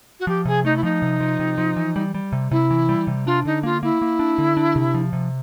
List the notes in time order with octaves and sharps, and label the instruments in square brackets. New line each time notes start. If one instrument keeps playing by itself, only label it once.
[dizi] F#4
[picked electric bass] F3 [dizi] G4
[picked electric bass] C3 [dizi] G#4
[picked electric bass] A3 [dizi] D#4
[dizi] E4
[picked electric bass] F3 [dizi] D#4
[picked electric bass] C3
F3
C3
F3
E3
G3
G3
C3
[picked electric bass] C3 [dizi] E4
[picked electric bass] E3
G3
C3
[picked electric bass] D4 [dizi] F4
[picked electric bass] D3 [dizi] D#4
[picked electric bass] A#3 [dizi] F4
[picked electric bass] A#3 [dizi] E4
[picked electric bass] A#3
D4
D3
D4
C3
F3
C3